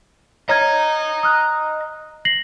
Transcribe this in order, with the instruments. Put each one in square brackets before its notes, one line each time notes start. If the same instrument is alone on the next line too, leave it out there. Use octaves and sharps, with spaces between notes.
[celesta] C#5 F6 G#6 [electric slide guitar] D#5 A#5
[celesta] D#6 F6 F#6
A#6 C7 F#7